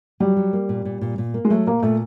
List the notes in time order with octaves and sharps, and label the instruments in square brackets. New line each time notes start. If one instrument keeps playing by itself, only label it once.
[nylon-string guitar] F#3 [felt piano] G3
[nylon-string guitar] F#3
A#3
A#2
A#2
A#2
A#2
A#3
[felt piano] G#3
[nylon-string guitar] F#3 [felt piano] A3
[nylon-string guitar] A#2 [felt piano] A#3
[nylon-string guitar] A#2 [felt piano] A3